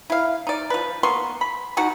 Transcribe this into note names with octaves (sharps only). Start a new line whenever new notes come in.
E4 F5
D#4 D5
F3 B4
A#3 B3 C6 C#6
B5
B2 D#4 F#4 F#5